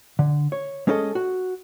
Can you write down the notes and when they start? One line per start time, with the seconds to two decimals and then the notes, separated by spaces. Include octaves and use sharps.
0.19 D3
0.52 C#5
0.87 G#3 C#4 G#4 A4 C5 D#5
1.15 F#4